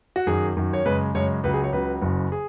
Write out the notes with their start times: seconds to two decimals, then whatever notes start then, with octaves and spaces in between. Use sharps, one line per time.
0.16 F#4
0.27 F#2 D#3 F#3 G#4
0.57 F#2 D#3 F#3
0.73 C#5
0.86 F#2 C#3 G#3 B4
1.15 F#2 C#3 G#3 C#5
1.44 C#2 C#3 F#3 B4
1.54 G#4
1.64 C#5
1.73 C#2 C#3 F#3 B4
2.02 F#1 F#2 C#3 F#3
2.32 G#4